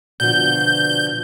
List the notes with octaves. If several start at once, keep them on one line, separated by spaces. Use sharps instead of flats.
B2 D3 F3 G6